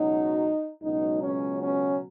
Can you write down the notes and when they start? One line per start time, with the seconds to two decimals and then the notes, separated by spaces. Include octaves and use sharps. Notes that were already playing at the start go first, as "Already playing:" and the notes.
Already playing: C#2 B2 F#3 D#4
0.82 C#2 B2 F#3 D#4
1.22 C#4
1.62 C#4